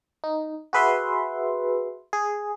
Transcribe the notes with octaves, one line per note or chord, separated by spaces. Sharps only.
D#4
F#4 G#4 B4 E5 C6
G#4